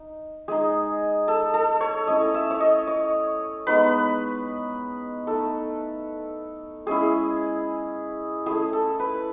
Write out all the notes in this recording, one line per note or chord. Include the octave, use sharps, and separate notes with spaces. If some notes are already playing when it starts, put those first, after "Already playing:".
Already playing: D#4
G#3 D#4 G#4
A4
A4
C#5
A3 C#4 E4 D#5
E5
C#5
D#5
C#5
G#3 B3 D#4 B4
A3 D#4 A4
G#3 C#4 E4 G#4
A3 C#4 E4 G#4
A4
B4